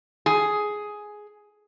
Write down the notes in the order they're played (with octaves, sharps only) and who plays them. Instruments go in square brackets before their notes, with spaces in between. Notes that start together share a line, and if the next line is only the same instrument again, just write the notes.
[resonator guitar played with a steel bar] G#4